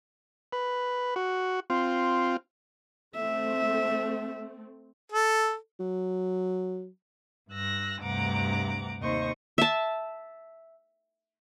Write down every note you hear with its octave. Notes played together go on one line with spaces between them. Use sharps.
B4
F#4
C4 F4
A3 C4 E5
A4
F#3
G2 E6 F#6 A#6
D2 G2 C3 F#5 A#5 D6
D#2 C3 C5 D#5 C#6
E5 A5